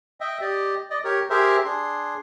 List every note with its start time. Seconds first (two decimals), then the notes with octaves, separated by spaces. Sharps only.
0.21 D#5 E5 G5
0.41 G4 D5 D#5
0.90 D5 D#5
1.04 G4 A#4 C#5
1.30 G4 G#4 A#4 C5 E5
1.65 D4 G#4 C6